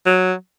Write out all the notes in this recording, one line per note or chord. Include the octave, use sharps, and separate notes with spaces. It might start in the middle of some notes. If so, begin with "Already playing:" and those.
F#3